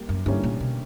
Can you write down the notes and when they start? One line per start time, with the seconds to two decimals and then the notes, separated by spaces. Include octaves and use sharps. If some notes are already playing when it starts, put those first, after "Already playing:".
Already playing: G3 A#3
0.09 F#2
0.26 G2 D3 G3 A#3 C#4 E4
0.43 A#2
0.60 B2